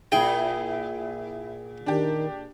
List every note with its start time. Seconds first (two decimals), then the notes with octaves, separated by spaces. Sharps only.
0.12 A#2 E4 G#4 G5
1.86 D#3 D4 G4